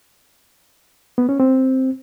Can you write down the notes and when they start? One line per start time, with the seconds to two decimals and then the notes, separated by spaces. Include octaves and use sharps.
1.18 B3
1.29 C#4
1.40 C4